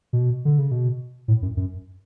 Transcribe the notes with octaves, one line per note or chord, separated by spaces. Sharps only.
B2
D3
C#3
B2
A2
F#2
F#2